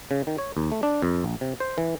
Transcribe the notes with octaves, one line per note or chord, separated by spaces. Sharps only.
C#3
D#3
C#5
D#2
A3
D4
F2
A#1
C3
C5
E3